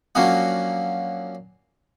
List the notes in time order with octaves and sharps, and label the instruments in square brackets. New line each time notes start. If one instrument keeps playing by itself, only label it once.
[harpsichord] F3 F#3 A#3 C#4 D4 F#4